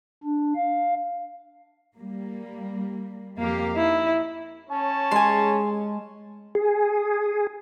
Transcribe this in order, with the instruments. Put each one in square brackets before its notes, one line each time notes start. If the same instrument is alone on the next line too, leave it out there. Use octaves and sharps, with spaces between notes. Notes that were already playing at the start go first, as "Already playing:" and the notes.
[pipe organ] D4
F5
[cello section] G3 A#3
[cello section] F2 G4 F5 [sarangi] A#3
[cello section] D#4 [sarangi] E4
[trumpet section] C#4 C#5 A5
[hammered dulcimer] G#3 [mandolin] G#5 C6
[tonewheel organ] G#4